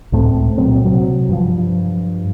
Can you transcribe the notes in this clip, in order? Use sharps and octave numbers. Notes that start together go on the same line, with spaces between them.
C#2 A2 A3 C4
A#2 F#3 C4
C3 F#3
G2 F3